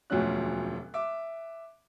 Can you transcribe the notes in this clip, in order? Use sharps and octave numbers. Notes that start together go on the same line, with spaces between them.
E1 D2 F3 F#3 C#4 F#6
E5 D6